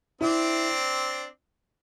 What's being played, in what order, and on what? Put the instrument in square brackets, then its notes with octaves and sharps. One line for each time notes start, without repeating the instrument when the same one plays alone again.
[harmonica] C4 D4 [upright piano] E4